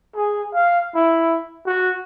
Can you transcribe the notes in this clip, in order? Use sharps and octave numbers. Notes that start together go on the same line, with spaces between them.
G#4
F5
E4
F#4